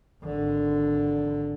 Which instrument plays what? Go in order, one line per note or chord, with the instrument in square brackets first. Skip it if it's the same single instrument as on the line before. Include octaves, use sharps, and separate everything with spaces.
[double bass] G#1 D3